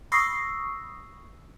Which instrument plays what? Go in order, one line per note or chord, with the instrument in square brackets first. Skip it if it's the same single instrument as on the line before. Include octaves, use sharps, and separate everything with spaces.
[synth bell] B5 C#6 D#6 E6 A#6 C7